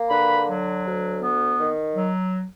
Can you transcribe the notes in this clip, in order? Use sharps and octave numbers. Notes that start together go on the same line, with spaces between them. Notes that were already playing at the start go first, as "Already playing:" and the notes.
Already playing: A#3
D3 B4 B5
F#3
D2
B3
D#3
F#3